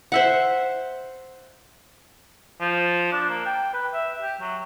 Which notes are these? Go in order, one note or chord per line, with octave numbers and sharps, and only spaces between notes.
C5 E5 F#5
F3
D4
A#3
G5
B4
E5
G4
F#3